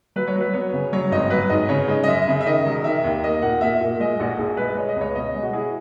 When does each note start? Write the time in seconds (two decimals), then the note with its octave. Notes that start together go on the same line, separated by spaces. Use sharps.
0.16 F#3 B4
0.28 C#5
0.35 F#3
0.41 B4
0.53 B3 C#5
0.73 C#3
0.93 F#3 C#5
1.11 G#1 D#5
1.30 F#3 B4
1.50 G#2 D#5
1.69 C#3 C#5
1.88 G#3
2.03 D#5
2.08 F#2 E5
2.28 C#3
2.41 E5
2.46 D#3 D#5
2.66 E1
2.84 D#3 E5
3.04 D#2
3.23 A#3 D#5
3.42 A#2 F#5
3.61 A#2 E5
3.81 A#2
4.00 G#3 D#5
4.19 A#1 F#4
4.38 A#1 G#4
4.57 G#3 B4
4.77 G#3 C#5
4.89 D#5
4.96 C#2
5.01 C#5
5.15 B2 D#5
5.35 G#3
5.43 F#4
5.53 E4 G#4